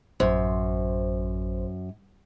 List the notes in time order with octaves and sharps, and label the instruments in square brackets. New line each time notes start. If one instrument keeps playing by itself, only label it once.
[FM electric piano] A1 C5 [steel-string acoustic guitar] F#2